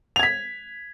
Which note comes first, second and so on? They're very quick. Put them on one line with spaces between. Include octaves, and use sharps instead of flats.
F7 G#6 B6